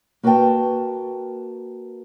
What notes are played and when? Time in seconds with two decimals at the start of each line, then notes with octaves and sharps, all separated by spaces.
0.23 A#3 F#4 B4 D5 G5 A5